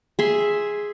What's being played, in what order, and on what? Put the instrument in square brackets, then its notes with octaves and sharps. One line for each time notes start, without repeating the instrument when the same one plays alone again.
[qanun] G#4 E5 C6